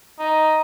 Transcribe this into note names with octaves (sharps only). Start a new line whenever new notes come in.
D#4